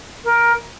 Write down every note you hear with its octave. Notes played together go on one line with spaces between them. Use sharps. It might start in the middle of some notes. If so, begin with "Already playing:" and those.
A#4